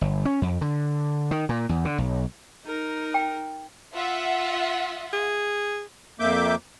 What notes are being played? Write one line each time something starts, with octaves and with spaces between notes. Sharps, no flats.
G1
C#4
F2
D3
D#3
A#2
E2
D3
B1
D#4 A#4
G5
F4 E5 F#5
G#4
F2 A#3 E5 D6 G6